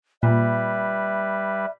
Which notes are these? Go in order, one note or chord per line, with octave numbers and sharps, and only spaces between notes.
A#2 G3 B4 E5